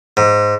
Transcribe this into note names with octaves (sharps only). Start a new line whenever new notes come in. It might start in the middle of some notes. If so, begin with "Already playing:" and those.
G#2